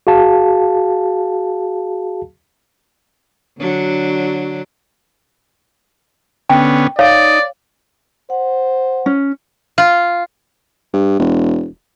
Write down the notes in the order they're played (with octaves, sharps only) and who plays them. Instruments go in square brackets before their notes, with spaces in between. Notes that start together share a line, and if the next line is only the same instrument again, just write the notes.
[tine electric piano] F#4 G#4 F5 A5
[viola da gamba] D3 F#3 D4
[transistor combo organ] D3 B3 C#4 [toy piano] G5
[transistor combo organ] D#4 [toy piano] C#5 F5 [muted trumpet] D5
[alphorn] C5 [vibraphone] F#5
[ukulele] C#4
[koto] F4
[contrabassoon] G2
E1